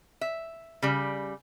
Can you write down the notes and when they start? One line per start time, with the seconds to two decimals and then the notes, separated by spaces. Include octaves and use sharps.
0.21 E5
0.82 C#3 G3